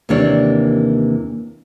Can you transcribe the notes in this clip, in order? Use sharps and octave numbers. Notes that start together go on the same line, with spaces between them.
D#2 C3 E3 A#3 D4 C#5